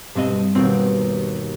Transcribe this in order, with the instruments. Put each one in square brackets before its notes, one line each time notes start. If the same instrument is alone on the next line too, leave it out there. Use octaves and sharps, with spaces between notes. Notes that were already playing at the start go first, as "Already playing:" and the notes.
[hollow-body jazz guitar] B1 C4 D#5 [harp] G2
[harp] D#2 B2 [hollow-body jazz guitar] C4